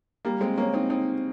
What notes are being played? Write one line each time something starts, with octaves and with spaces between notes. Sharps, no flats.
G3 A#3
G#3 C4
A#3 C#4
C4 D#4
C4 D#4